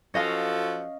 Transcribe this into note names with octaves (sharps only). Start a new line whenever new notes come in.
F3 C#4 F#4 A4 D#5 F5